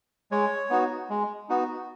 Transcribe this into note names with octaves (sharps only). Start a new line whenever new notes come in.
G#3 C#5
B3 D#4 F#4
G#3
B3 D#4 F#4